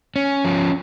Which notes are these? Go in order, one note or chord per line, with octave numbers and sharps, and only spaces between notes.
C#4
F3